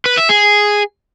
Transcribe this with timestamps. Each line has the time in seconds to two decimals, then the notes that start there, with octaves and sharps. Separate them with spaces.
0.06 B4
0.17 E5
0.29 G#4